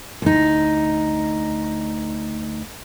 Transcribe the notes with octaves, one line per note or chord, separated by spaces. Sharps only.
D2 D#4